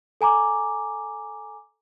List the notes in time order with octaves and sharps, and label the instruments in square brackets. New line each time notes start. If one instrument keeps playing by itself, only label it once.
[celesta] A4 G#5 A#5 D6